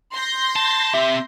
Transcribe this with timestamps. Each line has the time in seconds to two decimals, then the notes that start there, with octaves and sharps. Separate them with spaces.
0.15 C6 G6 A#6
0.56 A5
0.94 C4 G4 E5